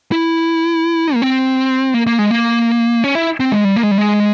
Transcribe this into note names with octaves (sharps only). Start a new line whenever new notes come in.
E4
A#3
C4
A#3
A#3
G#3
A#3
C#4
E4
C4
G#3
G3
A#3
G#3
G3
G#3